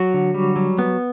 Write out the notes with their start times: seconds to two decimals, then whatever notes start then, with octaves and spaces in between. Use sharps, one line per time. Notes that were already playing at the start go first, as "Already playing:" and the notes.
Already playing: F#3 F#4
0.14 D3
0.34 G3
0.56 F#3
0.79 B3